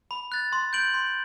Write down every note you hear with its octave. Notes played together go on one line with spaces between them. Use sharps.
B5
F#6 A6
C6
G6 D7 F#7
C6